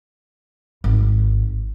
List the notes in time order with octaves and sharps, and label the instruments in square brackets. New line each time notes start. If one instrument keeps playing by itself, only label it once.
[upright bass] G#1